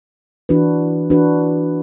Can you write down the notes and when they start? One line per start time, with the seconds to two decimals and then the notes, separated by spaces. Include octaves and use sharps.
0.49 E3 D4 F#4 B4
1.10 E3 D4 F#4 B4